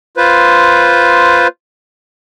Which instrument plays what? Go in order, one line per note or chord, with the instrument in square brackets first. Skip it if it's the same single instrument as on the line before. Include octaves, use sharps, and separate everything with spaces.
[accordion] F4 B4 C5